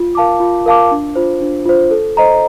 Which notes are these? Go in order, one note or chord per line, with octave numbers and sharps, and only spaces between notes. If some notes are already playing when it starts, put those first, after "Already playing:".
Already playing: F4
A#4 F5 A5 D6
F4
A#4 F5 A5 D6
D4
F4 C5
D4
F4 C5
A4
C5 D#5 A#5